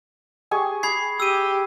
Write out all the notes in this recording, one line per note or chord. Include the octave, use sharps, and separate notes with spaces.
G4 G#4 C#6
G#4 B5 G#6 C7
G4 E6 D#7